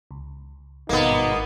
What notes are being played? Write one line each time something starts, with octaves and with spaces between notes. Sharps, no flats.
C#2
G#1 G2 B2 A#3 B3 D#4